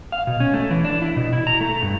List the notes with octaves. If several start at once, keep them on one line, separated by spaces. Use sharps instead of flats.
F5
B2
C#4
A3
E3
D4
E4
B2
E4
A#5
A3
G2